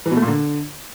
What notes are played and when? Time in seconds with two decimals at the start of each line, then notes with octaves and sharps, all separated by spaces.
0.06 E3
0.11 B2
0.17 A3
0.22 A#2
0.28 D3